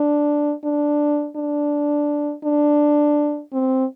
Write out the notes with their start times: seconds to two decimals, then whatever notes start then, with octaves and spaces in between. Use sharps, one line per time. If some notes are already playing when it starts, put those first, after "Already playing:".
Already playing: D4
0.64 D4
1.36 D4
2.44 D4
3.53 C4